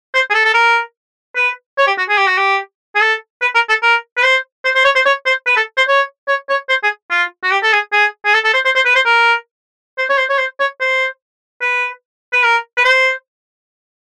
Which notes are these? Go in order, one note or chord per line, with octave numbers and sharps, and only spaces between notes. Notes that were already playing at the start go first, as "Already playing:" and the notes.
C5
G#4
A4
A4
A#4
B4
C#5
G4
F#4
G#4
G4
F#4
G4
G#4
A4
B4
A#4
A4
A#4
B4
C5
C5
C5
C#5
C5
C#5
C5
B4
A4
C5
C#5
C#5
C#5
C5
G#4
F4
F#4
G4
A4
G#4
G#4
G#4
A4
A4
C5
C5
C5
B4
C5
A#4
C5
C#5
C5
C#5
C5
C#5
C5
B4
B4
A#4
B4
C5